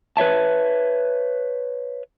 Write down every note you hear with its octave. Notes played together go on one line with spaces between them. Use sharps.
B4 C#5 E5 A5